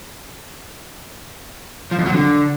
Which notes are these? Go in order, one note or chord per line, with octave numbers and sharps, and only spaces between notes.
F3
F2
F#3
D3